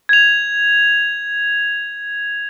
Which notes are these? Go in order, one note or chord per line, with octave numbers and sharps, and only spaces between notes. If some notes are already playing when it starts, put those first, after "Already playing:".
G#6 F7